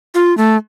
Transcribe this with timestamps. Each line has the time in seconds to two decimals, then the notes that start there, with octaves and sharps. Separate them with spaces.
0.15 F4
0.38 A3